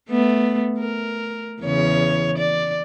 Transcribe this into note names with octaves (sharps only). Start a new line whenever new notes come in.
A3 B3
A#4
E2 C#3 C#5
D5